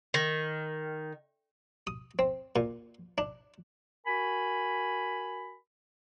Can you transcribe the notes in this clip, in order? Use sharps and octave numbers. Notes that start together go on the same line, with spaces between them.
D#3
D#6
C4
A#2
D4
F#4 A#4 G#5 B5